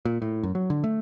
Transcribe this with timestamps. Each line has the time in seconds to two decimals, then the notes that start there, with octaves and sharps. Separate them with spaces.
0.05 A#2
0.22 A2
0.43 F#2
0.55 F#3
0.70 D3
0.84 A3